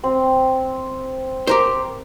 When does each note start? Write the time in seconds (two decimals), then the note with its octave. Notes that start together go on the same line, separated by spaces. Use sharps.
0.04 C4
1.47 G4 A#4 C5